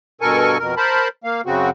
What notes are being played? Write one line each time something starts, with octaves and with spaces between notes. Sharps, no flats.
G2 B2 A4 A#4 G#5 C#6
F2 B2 A#4
A#4 C5 A5 B5
A#3 F5
F#2 C#3 C4 F#4